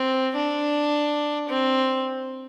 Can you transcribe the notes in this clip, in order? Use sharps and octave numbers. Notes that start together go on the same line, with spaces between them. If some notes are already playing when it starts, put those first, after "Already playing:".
Already playing: C4
D4
C4